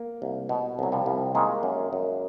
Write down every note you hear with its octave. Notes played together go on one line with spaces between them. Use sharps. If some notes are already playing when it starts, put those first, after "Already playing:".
Already playing: A#3
C2
B2
C2 F#3
F3 G3
C2
D#3 G#3 A#3
F#2
F#2